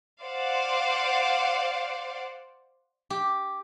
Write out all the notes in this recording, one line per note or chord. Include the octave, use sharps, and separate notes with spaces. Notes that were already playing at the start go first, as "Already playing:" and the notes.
C5 D5 F5 F#5
G4